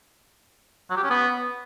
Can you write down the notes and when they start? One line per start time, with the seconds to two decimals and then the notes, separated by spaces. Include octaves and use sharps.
0.90 F#3
0.97 G4
1.03 C#4
1.10 B3